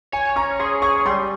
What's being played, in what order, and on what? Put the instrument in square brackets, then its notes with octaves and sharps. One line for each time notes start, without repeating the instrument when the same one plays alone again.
[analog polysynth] C#5 [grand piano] G#5
[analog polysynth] C#4 [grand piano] A#5
[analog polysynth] G#4 [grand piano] C6
[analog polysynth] G#4 [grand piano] C#6
[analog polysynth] G3 [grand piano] C6